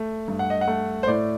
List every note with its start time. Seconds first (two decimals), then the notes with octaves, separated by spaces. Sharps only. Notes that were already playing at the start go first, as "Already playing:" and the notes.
Already playing: A3
0.28 G2
0.39 F#5
0.50 D#5
0.61 F#5
0.68 A3
1.03 C5
1.07 A2 D5